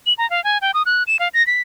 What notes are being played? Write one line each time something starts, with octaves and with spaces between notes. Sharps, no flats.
F#7
A#5
F5
G#5
G5
D#6
F#6
E7
F5
A#6
B6